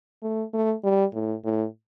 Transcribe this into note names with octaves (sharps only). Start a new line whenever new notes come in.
A3
A3
G3
A2
A2